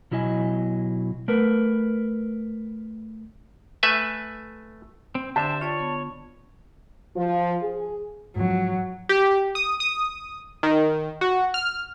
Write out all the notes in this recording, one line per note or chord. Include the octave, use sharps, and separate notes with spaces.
B2 F#3 E4 D#5 G#5
A3 A#4 B4
A3 B4 E5 G#5
C4
D3 D4 G4 C5 E5 A5
F4 C#5 D5 A6
B3
F3
G#4
G#2 F3 F#3
G4
D#6
D#6
D#3
F#4
F6